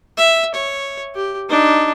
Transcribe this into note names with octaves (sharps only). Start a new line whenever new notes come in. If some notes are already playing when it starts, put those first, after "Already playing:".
E5
C#5
G4
D4 D#4